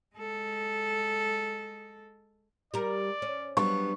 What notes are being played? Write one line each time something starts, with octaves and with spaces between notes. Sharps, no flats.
G#3 A4
G3 A#4 D5
C#4
F#3 G3 B3 D4 C#6